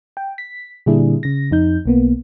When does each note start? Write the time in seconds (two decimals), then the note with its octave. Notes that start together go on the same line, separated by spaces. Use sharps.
0.17 G5
0.38 B6
0.86 A#2 D3 G3 D4 E4 G#4
1.23 C#3 A#6
1.51 F2 D#4 G6
1.86 B1 A#3 B3